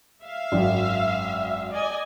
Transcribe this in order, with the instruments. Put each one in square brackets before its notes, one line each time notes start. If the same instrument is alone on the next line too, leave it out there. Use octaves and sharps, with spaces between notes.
[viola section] E5 F5
[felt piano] G#1 F#2
[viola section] D5 D#5 G#5